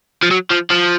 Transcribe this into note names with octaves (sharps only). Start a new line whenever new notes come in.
F3
F#3
F3
F3